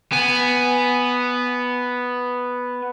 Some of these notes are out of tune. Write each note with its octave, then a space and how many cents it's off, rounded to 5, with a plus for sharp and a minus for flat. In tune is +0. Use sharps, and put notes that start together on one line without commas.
B3 +0 G#5 +0